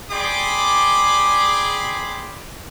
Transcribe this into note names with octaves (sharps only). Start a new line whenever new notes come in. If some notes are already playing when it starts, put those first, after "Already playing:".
G#4 D5 G5 B5 C6 D6